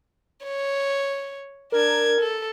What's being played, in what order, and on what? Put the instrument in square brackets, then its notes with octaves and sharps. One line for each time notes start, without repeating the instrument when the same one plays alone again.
[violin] C#5
[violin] D4 G#6 [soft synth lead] A#4
[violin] A4